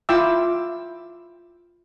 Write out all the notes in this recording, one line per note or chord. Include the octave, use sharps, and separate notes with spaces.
E4 F4 G5 D6 E6